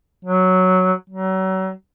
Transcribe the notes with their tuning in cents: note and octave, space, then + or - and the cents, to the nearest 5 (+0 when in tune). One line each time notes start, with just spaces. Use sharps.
F#3 +0
F#3 +35